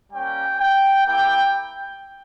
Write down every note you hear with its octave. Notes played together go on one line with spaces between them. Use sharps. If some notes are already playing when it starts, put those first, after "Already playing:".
G3 A#3 C#4 G5
G5
A#3 E4 G4 G5